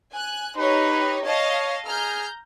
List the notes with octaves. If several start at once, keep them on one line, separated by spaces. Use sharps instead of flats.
G#5 F#6
D#4 G4 B4 C#5
C#5 D#5 F5 A5
G#4 A#5 F6 G6